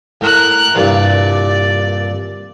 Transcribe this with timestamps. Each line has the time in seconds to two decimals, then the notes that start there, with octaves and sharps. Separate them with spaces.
0.21 A2 A#4 F#6
0.75 C2 G2 A#2 D5